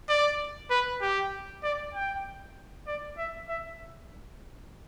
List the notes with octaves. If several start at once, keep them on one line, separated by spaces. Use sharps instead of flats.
D5
B4
G4
D5
G5
D5
E5
E5